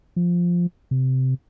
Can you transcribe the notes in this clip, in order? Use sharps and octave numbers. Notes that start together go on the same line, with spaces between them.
F3
C3